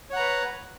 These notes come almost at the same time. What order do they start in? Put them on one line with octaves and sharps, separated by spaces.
C#5 F#5 A#5 B4